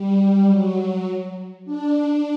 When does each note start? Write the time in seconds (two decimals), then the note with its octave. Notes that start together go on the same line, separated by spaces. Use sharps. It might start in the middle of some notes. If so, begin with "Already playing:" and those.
Already playing: G3
0.48 F#3
1.65 D4